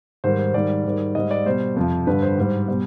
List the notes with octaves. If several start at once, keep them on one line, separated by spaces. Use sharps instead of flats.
G#2 D#3 G3 C5
C5
G#2 D#3 G3 D5
G#2 D#3 G3
G#2 G3 D#5
D5
B2 G3 C5
F2 C3 F3
G2 D3 G3 B4
C5
G#2 G3
B2 G3